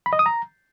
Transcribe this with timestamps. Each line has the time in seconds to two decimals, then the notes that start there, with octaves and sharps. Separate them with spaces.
0.06 B5
0.13 D#5
0.19 D#6
0.26 A#5